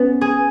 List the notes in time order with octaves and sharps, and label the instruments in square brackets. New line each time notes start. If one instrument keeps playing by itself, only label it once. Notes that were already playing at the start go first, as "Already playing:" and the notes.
Already playing: [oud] B3 [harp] C#4
[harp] G#4